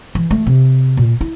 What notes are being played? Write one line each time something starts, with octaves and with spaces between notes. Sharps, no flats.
E3
A3
C3
A#2
E4